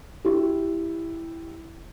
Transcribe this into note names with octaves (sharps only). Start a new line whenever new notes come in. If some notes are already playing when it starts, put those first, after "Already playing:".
E4 G4